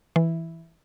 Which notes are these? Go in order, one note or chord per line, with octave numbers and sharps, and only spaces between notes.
E3